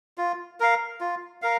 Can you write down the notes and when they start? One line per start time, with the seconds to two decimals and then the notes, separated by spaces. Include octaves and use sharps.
0.18 F4
0.60 A#4 F5
1.01 F4
1.42 A#4 F5